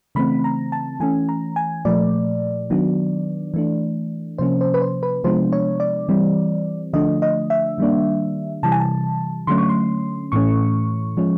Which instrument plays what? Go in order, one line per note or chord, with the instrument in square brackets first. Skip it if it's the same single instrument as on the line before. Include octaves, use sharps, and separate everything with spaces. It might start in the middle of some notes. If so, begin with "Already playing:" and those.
[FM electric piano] C#3 E3 A3 C4 B5
A#5
A5
E3 A3 C#4 G#5
A#5
G#5
A#2 F3 A3 D5
D#3 F#3 B3 D4
E3 A3 D4
C3 F3 A#3 C#4 C5
C5
B4
C5
B4
C3 F3 G#3 B3 D4 C5
C#5
D5
E3 G3 C4
D3 F3 A3 D4 D#5
D#5
E5
D#3 G3 A#3 D4
C3 E3 G3 A5
G#5
A5
D3 F#3 A3 C#4 C6
C#6
C6
A2 E3 A3 C#4 C#6
F3 G#3 C#4